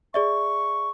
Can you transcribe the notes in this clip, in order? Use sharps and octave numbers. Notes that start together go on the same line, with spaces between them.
G#4 D5 E5 C#6